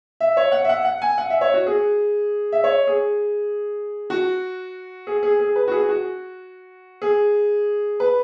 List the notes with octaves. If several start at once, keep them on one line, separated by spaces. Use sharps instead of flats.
E5
C#5
F#5
E5
F#5
F#5
G#5
F#5
E5
C#5
F#4
G#4
E5
C#5
G#4
F#4
G#4
G#4
G#4
B4
F#4
G#4
F#4
G#4
B4